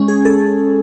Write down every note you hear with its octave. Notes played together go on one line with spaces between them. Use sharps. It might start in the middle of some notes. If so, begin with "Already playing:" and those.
Already playing: G#3 C#4
G#4
A4